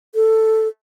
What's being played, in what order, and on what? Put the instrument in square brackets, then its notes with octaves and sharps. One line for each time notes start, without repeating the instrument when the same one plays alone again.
[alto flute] A4